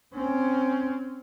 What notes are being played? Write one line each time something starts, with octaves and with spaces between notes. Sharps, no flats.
C4 C#4